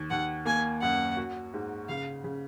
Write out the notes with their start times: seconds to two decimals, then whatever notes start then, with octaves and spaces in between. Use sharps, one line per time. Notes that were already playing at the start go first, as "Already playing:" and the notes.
Already playing: D#2
0.10 D#2 F#5
0.45 A#3 G#5
0.81 F#2 F#5
1.17 F#4
1.54 G#2
1.89 C#3 F5
2.24 C#3